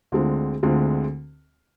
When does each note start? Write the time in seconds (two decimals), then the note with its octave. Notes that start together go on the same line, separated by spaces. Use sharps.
0.12 D2 D3 G#3 C4 F4
0.63 D2 D3 G#3 C4 F4